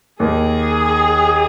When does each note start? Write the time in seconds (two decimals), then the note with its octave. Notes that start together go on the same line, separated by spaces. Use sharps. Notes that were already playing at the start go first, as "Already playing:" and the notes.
0.20 D#2 D#3 A#3 G#4